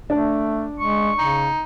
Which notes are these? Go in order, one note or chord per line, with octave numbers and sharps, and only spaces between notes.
A3 D4
G#3 C#6
C#3 D#4